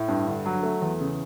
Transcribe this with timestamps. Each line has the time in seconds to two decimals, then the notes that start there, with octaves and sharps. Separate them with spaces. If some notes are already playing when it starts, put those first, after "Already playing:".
Already playing: A2
0.08 G2
0.27 D3
0.45 F#3
0.63 A3
0.82 E2
1.00 C#3